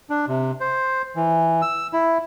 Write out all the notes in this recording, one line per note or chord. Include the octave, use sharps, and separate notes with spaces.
D4
C3
C5
E3
E6
E4